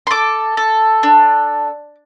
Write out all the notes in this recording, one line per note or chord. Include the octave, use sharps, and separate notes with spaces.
C6
A4 D6
A4
D4